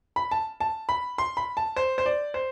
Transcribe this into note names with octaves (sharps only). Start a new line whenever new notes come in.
B5
A5
A5
B5
C6
B5
A5
C5
C5
D5
C5